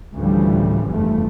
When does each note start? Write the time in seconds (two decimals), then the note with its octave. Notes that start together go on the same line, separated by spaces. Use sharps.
0.14 D2 A2 C#3 E3 F3 G3
0.87 F1 E2 G2 F3 A3